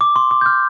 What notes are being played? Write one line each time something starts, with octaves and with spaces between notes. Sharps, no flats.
D6
C6
D6
G6
F6